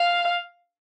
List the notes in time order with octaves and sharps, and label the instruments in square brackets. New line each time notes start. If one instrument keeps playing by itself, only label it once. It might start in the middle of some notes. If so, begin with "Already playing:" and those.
Already playing: [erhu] F5